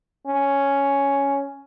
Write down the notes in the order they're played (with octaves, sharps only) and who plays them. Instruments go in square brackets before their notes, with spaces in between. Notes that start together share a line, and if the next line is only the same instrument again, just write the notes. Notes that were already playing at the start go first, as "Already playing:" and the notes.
[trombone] C#4